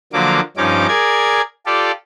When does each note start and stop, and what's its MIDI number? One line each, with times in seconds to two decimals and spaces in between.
0.13 0.40 50
0.13 0.40 53
0.13 0.40 54
0.13 0.40 58
0.13 0.40 86
0.57 0.87 43
0.57 0.87 53
0.57 0.87 61
0.57 0.87 63
0.57 0.87 86
0.88 1.41 68
0.88 1.41 70
0.88 1.41 74
0.88 1.41 92
1.66 1.92 65
1.66 1.92 67
1.66 1.92 69
1.66 1.92 74